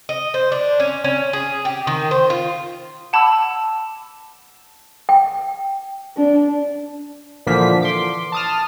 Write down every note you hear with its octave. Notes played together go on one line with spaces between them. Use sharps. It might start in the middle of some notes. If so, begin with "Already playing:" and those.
D#5
C5
D4
C#4
C#4
G#4
G4
D#3
C5
F4
F#5 A5 B5 D6 E6
G5
D4
A#2 D3 E3 F3 A#3 B6
C6 D6
A5 D#6 F6